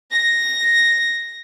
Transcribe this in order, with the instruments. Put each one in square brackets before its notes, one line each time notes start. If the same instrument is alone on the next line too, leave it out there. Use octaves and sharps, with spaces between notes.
[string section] A#6